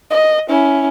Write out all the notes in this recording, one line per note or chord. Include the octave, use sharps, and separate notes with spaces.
D#5
C#4 E4